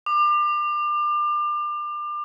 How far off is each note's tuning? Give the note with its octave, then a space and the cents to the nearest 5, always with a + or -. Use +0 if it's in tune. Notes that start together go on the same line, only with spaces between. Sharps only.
D6 +30